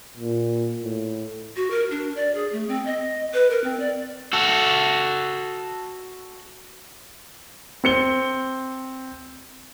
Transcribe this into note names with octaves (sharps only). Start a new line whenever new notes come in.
A#2
A2
F#4
A#4
D4
D5
G#4
A3
C4
D#5
B4
A#4
C4
D5
F#4 A4
C4 C#7 G7